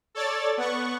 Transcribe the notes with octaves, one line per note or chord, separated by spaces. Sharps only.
A4 C#5 D5 A6
B3 F#5 C#6